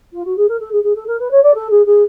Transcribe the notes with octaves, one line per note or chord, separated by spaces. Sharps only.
F4
F#4
G#4
A#4
A4
G#4
G#4
A4
A#4
B4
C#5
D5
A4
G#4
G#4